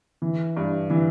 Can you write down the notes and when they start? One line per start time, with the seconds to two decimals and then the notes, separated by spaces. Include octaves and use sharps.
0.22 E3
0.57 G2
0.90 E3